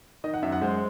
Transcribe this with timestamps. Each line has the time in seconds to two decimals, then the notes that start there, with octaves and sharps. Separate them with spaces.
0.24 D#3 D#5
0.34 F#5
0.43 F#2 E5
0.52 F#5
0.62 G#3 C5